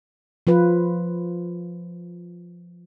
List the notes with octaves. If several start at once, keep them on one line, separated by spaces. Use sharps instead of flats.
F3 F4 B4